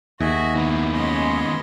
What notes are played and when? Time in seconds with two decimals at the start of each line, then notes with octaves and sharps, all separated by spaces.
0.20 D#2 F#4 G#4 D#5 E5
0.56 D#3 G#3 B3 E4
0.94 G#3 C#4 D#5 B5 C6